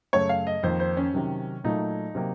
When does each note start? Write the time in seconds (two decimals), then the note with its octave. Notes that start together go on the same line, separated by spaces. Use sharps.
0.13 F#2 C#3 A3 C#5
0.29 F5
0.47 D#5
0.63 F2 D#3 A#3 C5
0.80 C5
0.97 C#4
1.14 C3 D#3 F#3
1.64 A#2 F#3 A3 D#4
2.15 C3 F#3 A#3